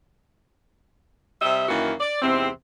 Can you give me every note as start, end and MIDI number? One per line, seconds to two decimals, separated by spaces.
1.41 1.66 48
1.41 1.66 55
1.41 1.66 75
1.41 1.66 76
1.69 1.93 42
1.69 1.93 51
1.69 1.93 52
1.69 1.93 58
1.69 1.93 64
1.69 1.93 66
2.00 2.21 74
2.22 2.48 40
2.22 2.48 44
2.22 2.48 48
2.22 2.48 60